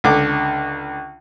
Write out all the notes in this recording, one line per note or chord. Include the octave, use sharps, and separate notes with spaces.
C#2 D3 D6